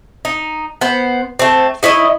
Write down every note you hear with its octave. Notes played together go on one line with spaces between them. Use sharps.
D#4
B3 C5
A3 C4
D#4 E4 C#5 D#5